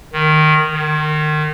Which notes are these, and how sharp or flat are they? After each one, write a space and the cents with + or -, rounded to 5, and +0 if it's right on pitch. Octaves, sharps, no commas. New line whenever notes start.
D#3 -10
D#3 -30